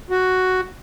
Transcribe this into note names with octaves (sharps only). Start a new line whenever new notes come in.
F#4